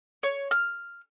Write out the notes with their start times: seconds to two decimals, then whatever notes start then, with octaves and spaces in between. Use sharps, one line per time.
0.23 C#5
0.51 F6